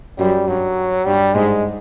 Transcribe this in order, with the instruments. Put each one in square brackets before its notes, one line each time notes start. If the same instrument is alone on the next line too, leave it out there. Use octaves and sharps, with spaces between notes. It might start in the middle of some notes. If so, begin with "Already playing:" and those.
[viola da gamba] F#2 [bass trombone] G3
[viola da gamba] G2 [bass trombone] F#3
[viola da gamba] G2 [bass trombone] G3
[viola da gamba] G#2 [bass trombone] G#3